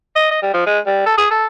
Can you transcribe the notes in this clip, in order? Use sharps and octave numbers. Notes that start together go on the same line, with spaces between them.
D#5
D#5
G3
F3
G#3
G3
A4
G#4
A4